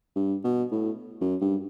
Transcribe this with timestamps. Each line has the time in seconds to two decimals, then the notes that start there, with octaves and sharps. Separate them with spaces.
0.16 G2
0.44 B2
0.71 A2
1.21 F#2
1.41 G2